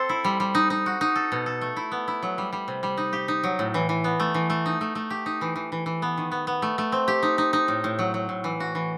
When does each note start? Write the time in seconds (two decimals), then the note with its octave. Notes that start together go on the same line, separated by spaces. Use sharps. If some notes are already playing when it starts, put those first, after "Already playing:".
Already playing: C4 A4 C5
0.09 E4
0.24 G3
0.40 G3
0.55 D#4
0.70 D#4
0.86 F#4
1.01 D#4
1.16 A4
1.32 B2
1.46 A4
1.61 A3
1.77 E4
1.92 B3
2.08 E4
2.23 F#3
2.38 G3
2.53 G3
2.68 C3
2.83 G3
2.98 D#4
3.13 G4
3.28 D#4
3.44 F#3
3.59 A2
3.74 E3
3.89 E3
4.04 B3
4.20 A3
4.34 E3
4.50 A3
4.66 D#4
4.81 A3
4.95 A3
5.10 G4
5.26 D#4
5.41 E3
5.56 E3
5.72 E3
5.86 E3
6.02 B3
6.18 D#3
6.31 B3
6.47 B3
6.62 A3
6.78 A3
6.92 C4
7.08 G4
7.23 D#4
7.38 D#4
7.53 D#4
7.68 A2
7.84 A2
7.99 F#3
8.14 F#3
8.29 A2
8.44 E3
8.60 F#4
8.75 E3